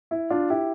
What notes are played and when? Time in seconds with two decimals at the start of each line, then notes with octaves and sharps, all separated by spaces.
0.11 E4
0.30 D4 F4
0.50 E4 G4